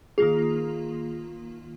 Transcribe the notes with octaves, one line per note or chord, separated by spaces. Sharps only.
D#3 A#3 F4 G#4